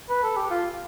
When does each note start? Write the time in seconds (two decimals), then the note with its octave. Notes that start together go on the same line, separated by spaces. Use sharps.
0.10 B4
0.23 A4
0.37 G4
0.51 F4